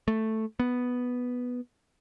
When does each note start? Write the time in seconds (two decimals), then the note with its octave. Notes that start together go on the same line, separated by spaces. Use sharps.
0.08 A3
0.60 B3